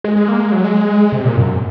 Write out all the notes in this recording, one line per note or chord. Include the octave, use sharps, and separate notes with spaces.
G#3
G#3
A#3
G#3
F#3
G#3
C3
A#2
F#2